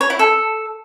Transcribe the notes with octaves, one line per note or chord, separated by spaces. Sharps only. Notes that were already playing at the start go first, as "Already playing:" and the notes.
C#5
E4
A4